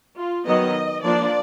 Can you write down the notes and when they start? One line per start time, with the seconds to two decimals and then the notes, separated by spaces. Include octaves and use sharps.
0.17 F4
0.46 D#3 F#3 B3 D#5
1.03 F3 A#3 D4 F4 D5